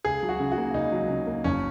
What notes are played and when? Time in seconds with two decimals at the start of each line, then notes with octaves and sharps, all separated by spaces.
0.05 C#2 G#4
0.23 F#3
0.29 F#4
0.40 C#3
0.52 F#4
0.58 A#3
0.74 C#2 D#4
0.92 F#3
1.09 C#3
1.27 A#3
1.44 F#1 C#4